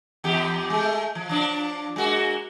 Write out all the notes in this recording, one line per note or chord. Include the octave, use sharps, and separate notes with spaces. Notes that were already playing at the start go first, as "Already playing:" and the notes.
E2 G4
G#3 A3
F3
F3 D4
G#3 A#3 F#4